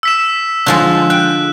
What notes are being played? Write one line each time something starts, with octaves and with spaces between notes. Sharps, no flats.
E6 B6 E7
D3 F3 G#3 F#6
G5 F#6